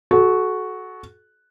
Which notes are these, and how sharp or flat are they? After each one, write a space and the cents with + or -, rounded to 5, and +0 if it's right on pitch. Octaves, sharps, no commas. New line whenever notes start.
F#4 +0 A4 -35